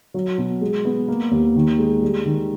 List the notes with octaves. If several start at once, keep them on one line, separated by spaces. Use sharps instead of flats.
F#3
B2
G#3
B3
A#3
D#2
D#3
G#3
G3
D#3